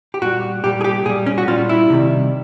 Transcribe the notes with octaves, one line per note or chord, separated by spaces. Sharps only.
G4
A#2 G3 F#4
A#2 G3 G4
G#4
G4
A#2 G3 G#4
C#4
F#4
A#2 G3 F4
E4
C3 D#3 G3